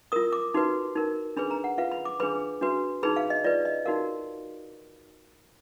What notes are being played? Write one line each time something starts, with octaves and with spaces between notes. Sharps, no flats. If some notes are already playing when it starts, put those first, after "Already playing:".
F4 A#4 D#6
D6
D#4 F#4 B4
D#4 A#4
D4 G#4 B4 B5
A#5
F#5
F4 B4 F5
B5
D6
D4 G#4 B4 B5
D4 F#4 B4
D#4 G#4 B4 B5
F5
D#5
F4 B4 D5
D#5
D#4 F#4 A#4 F5